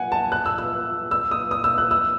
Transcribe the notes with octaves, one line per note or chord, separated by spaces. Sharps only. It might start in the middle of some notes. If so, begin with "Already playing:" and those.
Already playing: F#5 G#5
A5
F#6
E6
E6
E6
D#6
D#6
E6
F#6
E6